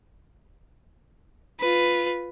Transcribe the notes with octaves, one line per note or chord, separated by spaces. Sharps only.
F4 B4